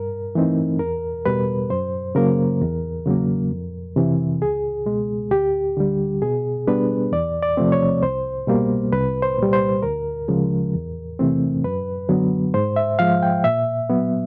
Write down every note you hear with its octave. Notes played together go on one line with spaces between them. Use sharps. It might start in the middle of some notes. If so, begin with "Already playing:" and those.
Already playing: G2 A#4
E3 A3 C4 D#4
E2 A#4
B2 G3 B4
F#2 C5
C#3 F#3 A#3 A#4
E2
C#3 F#3 A#3
F2
C3 E3
C#2 G#4
B2 G#3
D2 G4
D3 G3
B2 G#4
G3 B3 D4 B4
E2 D5
D5
C3 F3 A3 C4
C#5
C2 C5
B2 G3 A#3
C2 B4
C5
A#2 G3
C5
D2 A#4
C#3 F3 G#3
E2
C3 E3 A3 C4
F#2 B4
D3 F#3 B3
G#2 C5
E5
F3 G#3 F5
G5
A#2 E5
F#3 B3